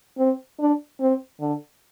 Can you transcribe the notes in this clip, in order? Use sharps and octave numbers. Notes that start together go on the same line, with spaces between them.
C4
D4
C4
D3